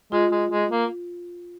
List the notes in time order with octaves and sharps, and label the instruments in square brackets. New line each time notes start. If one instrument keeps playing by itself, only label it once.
[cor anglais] G#3 [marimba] F4
[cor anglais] G#3
G#3
A#3